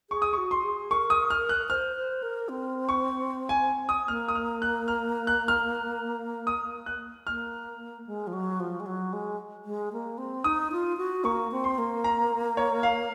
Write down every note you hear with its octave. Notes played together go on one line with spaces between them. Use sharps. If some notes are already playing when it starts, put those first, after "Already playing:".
G#4 C#6
D#6
F#4 C#6
C6
G#4
A#4 C#6
D#6
F6
F#6
C5 F6
C5
A#4
C4
C#6
G#5
D#6
A#3 F6
D#6
F6
F#6
F6
F#6
F6
D#6
F#6
A#3 F6
G#3
F3
F#3
F3
G#3
F#3
G#3
G#3
A#3
C4
D#4 D#6
F4
F#4
A#3 C#6
C4
C6
A#3
A#5
C#5
F5